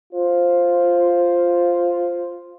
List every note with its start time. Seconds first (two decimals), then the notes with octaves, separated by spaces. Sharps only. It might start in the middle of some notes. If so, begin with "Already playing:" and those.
0.13 F4 C5